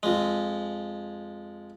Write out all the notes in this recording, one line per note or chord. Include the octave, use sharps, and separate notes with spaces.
F2 G#3